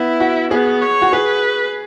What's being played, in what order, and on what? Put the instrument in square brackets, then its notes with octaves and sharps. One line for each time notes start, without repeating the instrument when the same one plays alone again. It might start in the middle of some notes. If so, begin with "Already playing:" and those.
Already playing: [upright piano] B3 [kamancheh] E4
[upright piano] F#4
[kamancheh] B3 [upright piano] G#4
[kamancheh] C#5
[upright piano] F#4
[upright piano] G#4 [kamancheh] B4